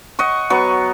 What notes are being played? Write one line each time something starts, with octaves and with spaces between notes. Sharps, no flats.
D#5 F#5 C#6
F#3 B3 C#6